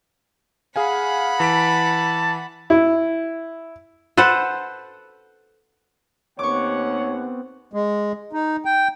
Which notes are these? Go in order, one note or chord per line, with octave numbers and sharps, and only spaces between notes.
G#4 F5 F#5 G#5 B5
E3 A5 B6 D7
E4
A4 B4 C5 F#5
D#2 B3 C4 C#5 F#5 C#6 D6
G#3
D#4
G5